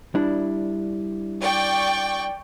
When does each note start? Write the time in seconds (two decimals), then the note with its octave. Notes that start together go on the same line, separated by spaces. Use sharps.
0.15 G3 D4 E4
1.42 D5 G5 C#6